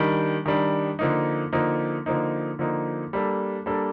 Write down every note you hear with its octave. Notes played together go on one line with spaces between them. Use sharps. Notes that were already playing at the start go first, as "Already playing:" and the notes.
Already playing: D#3 G3 D4
D#3 G3 D4
D3 F3 A#3 D#4
D3 F3 A#3 D#4
D3 F3 A#3 D#4
D3 F3 A#3 D#4
G3 A#3 D4 A4
G3 A#3 D4 A4